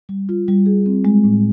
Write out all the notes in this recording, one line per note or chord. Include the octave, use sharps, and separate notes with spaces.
G3
F4
G3
G#4
C4
G#3
A2